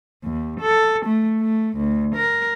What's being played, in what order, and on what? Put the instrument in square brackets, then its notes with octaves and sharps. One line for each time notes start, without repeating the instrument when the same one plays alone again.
[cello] D#2
A4
A3
A3
D2
A#4